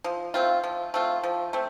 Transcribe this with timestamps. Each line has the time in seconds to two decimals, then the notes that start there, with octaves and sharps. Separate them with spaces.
0.04 F3
0.34 A3 C4 F4
0.64 F3
0.94 A3 C4 F4
1.23 F3
1.53 A3 C4